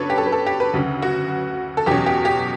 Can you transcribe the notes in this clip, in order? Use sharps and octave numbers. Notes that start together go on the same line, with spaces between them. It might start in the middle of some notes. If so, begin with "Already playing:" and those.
Already playing: C#3 F#3 B3 D4 A4 B4 C#5
G4
A4
B4
A4
G4
B4
D2 C#3 F#3
F#4
A4
E2 B2 F#3 C#4 G4
G4
G4